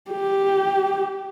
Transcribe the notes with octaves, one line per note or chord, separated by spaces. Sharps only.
G4